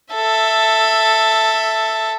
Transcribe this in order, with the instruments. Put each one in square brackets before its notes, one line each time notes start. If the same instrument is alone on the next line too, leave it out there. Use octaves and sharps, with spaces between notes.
[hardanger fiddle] A4 E5